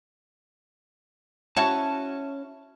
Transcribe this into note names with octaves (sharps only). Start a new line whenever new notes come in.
C#4 E4 F#4 A5